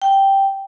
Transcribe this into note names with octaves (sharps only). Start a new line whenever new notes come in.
G5